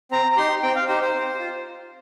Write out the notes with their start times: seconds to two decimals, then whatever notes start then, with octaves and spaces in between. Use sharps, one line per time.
0.11 C4 A#5
0.32 A#5
0.37 D#4 G4 C6
0.63 C4 G5
0.76 F5
0.88 D#4 G4 C5
1.02 C5
1.14 C4
1.39 F4